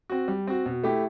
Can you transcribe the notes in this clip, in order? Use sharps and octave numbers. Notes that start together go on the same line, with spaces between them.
C4 F#4
G3
C4 F#4
B2
A3 E4 G4